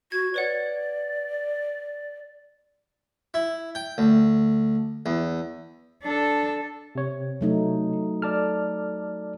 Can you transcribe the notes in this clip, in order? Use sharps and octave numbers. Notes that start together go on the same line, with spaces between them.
F#4 G#6
B4 C#5 D5 F#5
E4
G5
D2
E2
D4 A4
C3 C#5
F#3 A3 D#4
A4 D5 A5 F6